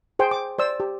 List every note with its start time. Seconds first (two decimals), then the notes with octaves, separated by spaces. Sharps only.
0.19 G#4 C5 G5
0.31 D6
0.59 C5 D5 E6
0.80 G4